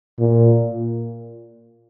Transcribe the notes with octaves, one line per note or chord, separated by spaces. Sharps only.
A#2